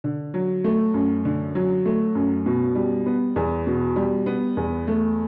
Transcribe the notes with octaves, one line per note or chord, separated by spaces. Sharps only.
D3
F#3
A3
F#2
D3
F#3
A3
F#2
B2
G3
B3
E2
B2
G3
B3
E2
A3